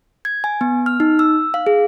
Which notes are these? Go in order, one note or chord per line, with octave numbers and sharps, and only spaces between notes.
G#6
G#5
B3
F6
D#4
E6
F5
G#4